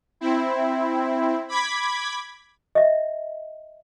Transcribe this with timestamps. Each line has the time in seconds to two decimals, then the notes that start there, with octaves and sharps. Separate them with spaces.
0.21 C4 E4
1.48 B5 D6 G#6 B6
2.75 D#5 E5